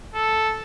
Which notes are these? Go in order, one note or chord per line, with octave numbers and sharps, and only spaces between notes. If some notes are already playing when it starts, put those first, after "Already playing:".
A4